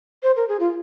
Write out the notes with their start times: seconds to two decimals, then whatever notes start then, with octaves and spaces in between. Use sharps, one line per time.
0.23 C5
0.36 A#4
0.48 G#4
0.60 F4